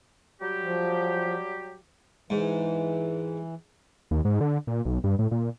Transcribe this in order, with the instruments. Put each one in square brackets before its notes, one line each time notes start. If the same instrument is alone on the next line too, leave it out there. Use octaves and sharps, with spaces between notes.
[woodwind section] F#3 G3 G4
[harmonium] F3
[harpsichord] G#2 [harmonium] E3
[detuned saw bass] D#2
G#2
D3
A#2
B1
G2
A2
A#2